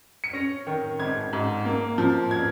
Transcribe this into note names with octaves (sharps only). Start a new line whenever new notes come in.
C#7
C#4 A#6
D#3
G#1 G#6
G#2
A#3
F3
G#6